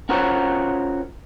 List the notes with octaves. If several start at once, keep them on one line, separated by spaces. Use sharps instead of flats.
C#4 F4 F#4 A#4 C5 C#5